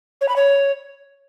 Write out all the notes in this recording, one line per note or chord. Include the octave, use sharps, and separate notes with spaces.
C#5
B5
C#5